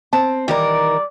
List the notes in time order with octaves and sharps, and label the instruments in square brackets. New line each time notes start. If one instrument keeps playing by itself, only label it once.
[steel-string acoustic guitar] C4 [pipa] A5
[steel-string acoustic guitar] D#3 E3 A#4 [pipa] G3 [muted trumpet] D5